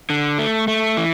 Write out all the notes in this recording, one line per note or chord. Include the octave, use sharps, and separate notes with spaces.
D3
A3
A3
E3